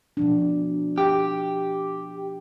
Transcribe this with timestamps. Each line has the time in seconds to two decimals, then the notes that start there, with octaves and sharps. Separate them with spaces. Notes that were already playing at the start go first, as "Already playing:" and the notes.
0.17 B2 F3 D4
0.98 G4